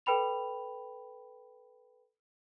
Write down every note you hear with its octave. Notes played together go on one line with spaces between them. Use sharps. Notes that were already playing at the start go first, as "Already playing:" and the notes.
A4 B4 G5 B5 F7